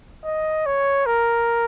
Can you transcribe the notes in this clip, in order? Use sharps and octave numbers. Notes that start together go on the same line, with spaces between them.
D#5
C#5
A#4